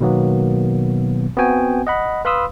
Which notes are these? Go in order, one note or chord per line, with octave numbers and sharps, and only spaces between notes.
B2 D#3 F#3 A#3 B3
B3 C4 F#4 G5 G#5
D#5 F#5 B5
B4 F5 B5 C6 D#6 E6